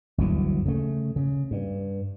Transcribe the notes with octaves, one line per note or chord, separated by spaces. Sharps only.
G1 D2 E3 F#3
C#3 A3
C#3
G2